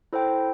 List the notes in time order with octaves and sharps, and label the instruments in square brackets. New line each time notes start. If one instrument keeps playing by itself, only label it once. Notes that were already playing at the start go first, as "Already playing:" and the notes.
[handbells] E4 A4 C5 G5